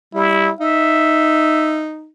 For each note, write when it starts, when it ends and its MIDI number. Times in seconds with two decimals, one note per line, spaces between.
0.14 0.50 55
0.14 0.54 64
0.61 2.08 63
0.61 1.85 76